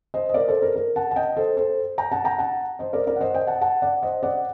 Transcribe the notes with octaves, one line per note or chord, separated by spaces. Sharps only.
C5 D#5
D#5
A#4 D5
A4 C5
A#4
A#4
F#5 A5
A5
D#5 G5
A4 C5
A4 C5
G5 A#5
F#5 A5
G5 A#5
F#5 A5
C5 D#5
A#4 D5
A#4 D5
F#5
C5 D#5
D#5 G5
F#5 A5
F#5 A5
D5 F#5
C5 D#5
D5 F#5